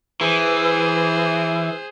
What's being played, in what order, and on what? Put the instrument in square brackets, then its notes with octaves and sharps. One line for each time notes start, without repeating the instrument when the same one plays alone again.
[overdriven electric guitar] E3 [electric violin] G#4 C5